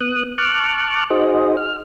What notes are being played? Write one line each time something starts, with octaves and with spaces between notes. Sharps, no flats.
B3 D#6 F#6
A5 C#6 D6 F6 F#6
D#4 F#4 G#4 C5 D#5
F6